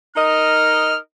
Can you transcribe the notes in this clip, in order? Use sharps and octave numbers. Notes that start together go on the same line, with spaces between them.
D#4 A#4 D#5 F6